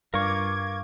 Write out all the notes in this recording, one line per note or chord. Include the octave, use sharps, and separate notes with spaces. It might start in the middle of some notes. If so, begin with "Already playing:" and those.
G2 F4 A#4 C#6 D6 G#6